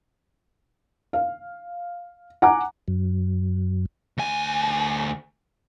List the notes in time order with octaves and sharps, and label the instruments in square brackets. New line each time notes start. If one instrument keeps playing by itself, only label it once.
[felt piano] F5
F#5 G#5 A#5 D6
[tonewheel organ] F#2
[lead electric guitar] D2 G#5